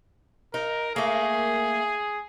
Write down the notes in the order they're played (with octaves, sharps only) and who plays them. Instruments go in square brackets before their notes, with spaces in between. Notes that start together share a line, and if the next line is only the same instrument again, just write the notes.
[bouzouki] D#4 [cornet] A#4
[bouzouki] A3 A#3 [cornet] G#4